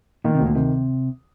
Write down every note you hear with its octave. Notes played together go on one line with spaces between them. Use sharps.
A#2 D#3
C3
D2
A#2
C3 D#3